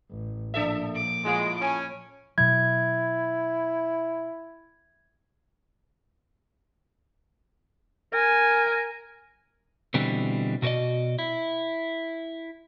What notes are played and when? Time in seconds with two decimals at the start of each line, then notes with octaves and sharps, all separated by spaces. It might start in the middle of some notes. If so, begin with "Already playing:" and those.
0.10 A1
0.54 A#2 F3 D4 A4 E5
0.95 D6
1.25 A2 G#3 F4
1.61 C#4 G#5
2.38 B2 F#3 E4 G#6
8.14 A#4 G#5
9.94 B2 D3 E3 G3 C4
10.62 B2 F#4 A#4 D5 D#5
11.19 E4